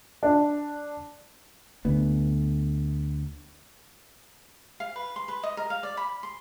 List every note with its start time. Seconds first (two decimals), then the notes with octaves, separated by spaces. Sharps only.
0.23 D4
1.85 D2 B3
4.80 F5
4.96 B4
5.16 C6
5.28 B4
5.43 D#5
5.57 A#4
5.70 F5
5.83 D5
5.97 B5
6.23 C6